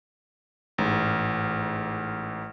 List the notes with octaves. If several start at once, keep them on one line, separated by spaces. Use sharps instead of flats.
A1 G#2